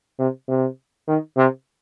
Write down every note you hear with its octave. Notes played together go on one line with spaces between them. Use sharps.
C3
C3
D#3
C3